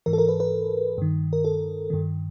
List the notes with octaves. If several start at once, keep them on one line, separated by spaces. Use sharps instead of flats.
G#2 E3 A#4
A4
A#4
B4
B4
G2 D#3
A#4
A4
G2 D#3